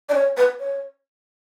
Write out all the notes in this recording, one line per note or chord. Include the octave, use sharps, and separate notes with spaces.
D5
C#5
B4
C#5